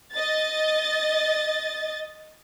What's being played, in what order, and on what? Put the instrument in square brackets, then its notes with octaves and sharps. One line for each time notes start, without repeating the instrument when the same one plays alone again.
[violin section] D#5 A6